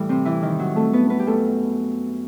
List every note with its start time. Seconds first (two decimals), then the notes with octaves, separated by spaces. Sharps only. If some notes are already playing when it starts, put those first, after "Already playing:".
Already playing: A2 E3 G3
0.09 C3 C4
0.25 E3 E4
0.42 D#3 D#4
0.59 F#3 F#4
0.76 A3 A4
0.93 B3 B4
1.10 B3 B4
1.20 G4
1.26 F#2 F#3 A3 A4